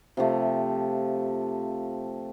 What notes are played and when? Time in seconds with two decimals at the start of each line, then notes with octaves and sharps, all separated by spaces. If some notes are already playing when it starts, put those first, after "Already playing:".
0.17 C3 F3 A3